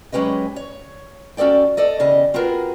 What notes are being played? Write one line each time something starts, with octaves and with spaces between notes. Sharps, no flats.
F#3 G#3 C#4 G4 B4 D#5
C#5
C#4 F#4 A4 D5 G5
A4 D5 D#5
E2 C#3 G4 D#5
C4 F4 F#4 G#4 A#4 B4